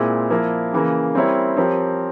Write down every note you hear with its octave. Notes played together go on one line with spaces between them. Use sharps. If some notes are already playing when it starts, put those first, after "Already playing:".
Already playing: A#2 G#3 C4 E4
F3 A#3 E4 A#4
C#3 E3 A#3
G3 C4 E4 A#4 C#5
F3 C4 G4 A#4 C#5